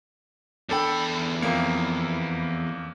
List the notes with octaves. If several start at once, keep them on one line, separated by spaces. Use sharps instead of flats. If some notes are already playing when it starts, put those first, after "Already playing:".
E2 D4 A4 G5 B5
F2 A#3